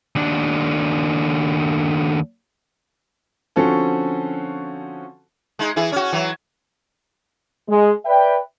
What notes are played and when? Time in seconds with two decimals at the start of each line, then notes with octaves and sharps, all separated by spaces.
0.16 D#2 D4
3.56 D3 F3 C4 C#4 F#4 A4
5.59 G#3 D#4
5.76 E3 E4 G#4
5.92 C#4 F#4
6.13 E3 F#3
7.69 G#3
8.05 B4 D5 E5 G5